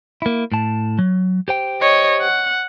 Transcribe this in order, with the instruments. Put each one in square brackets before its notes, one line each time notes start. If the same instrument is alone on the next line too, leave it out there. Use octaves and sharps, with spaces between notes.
[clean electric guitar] A#3 E4
A2 A5
F#3
G4 C5 G5
[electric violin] C#5 D#5
F#5